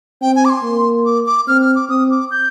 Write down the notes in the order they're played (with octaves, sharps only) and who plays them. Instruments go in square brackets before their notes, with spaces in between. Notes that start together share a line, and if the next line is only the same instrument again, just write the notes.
[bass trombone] C4 [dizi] G5
[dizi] G#5
D6
C6
[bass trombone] A#3
[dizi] D6
D6
[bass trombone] C4 [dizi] F6
[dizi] F6
D6
[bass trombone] C4 [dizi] D#6
[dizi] D6
G6